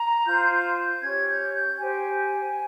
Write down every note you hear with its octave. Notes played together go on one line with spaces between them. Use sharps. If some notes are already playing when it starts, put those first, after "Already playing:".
Already playing: A#5
F4 C5 G6
G6
G6
C#4 G4 C#5 G#6
G6
G6
G4 C5 G#5